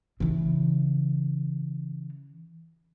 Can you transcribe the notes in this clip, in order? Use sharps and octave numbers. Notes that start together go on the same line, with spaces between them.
C#3 E3